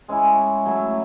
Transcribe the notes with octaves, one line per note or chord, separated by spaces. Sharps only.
G#3 C#4 E4
F#3 A3 E4